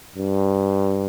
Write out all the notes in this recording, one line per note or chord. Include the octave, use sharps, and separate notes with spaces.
G2